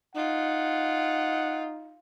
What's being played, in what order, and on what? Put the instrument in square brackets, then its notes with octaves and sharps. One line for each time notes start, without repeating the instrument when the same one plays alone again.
[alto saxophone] D#4 [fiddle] F4 [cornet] F#5